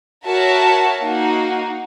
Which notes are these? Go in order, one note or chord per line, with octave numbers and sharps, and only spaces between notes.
F#4 A#4 C#5 E5 A5
A#3 D#4 F#4